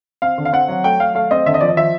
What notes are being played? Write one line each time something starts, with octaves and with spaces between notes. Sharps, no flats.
C4 F5
D3
F5
C4 F#5
F#3
A3 G5
F#3 F5
A3 F5
C4 D#5
D3 E5
D#5
F3 D5
D#5
F3 E5